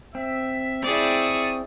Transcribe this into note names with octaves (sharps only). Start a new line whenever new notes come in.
C4 E5
C4 E4 G#4 D5 G5 A5 C#6 D#6